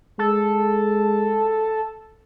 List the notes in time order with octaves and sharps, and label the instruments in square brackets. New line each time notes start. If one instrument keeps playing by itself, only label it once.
[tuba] G#3 [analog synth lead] A4